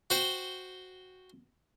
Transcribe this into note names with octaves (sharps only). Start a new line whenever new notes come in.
F#4 C5 G5